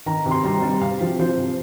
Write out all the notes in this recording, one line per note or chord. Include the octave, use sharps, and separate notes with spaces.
D#3 A#5
C3
C6
G3 A#5
G3
C3 F5
F3
F3 C5
C3